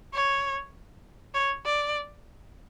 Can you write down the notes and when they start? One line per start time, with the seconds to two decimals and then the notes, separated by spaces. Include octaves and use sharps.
0.14 C#5
1.34 C#5
1.65 D5